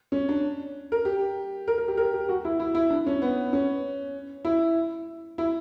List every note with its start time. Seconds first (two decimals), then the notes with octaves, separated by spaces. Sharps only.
0.12 C#4
0.29 D4
0.92 A#4
1.05 G4
1.68 A#4
1.78 A#4
1.88 G4
1.97 A#4
2.14 G4
2.29 F#4
2.45 E4
2.60 E4
2.75 E4
2.90 D4
3.06 C#4
3.22 B3
3.53 C#4
4.45 E4
5.38 E4